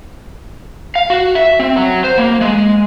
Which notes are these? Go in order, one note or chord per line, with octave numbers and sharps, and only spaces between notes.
F5
F#4
E5
C4
F#3
C5
A#3
G#3